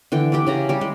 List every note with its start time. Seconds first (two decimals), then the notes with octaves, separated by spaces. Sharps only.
0.12 D3 E3 G5
0.32 D4 E4 G4 G5
0.47 C#3 G4 A#5
0.69 G3 G4
0.81 G#3